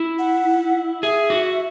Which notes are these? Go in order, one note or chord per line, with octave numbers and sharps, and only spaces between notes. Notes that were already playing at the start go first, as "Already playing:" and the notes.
Already playing: E4
F#5
G#4 E5
F#4